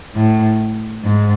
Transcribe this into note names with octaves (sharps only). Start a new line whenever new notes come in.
A2
G#2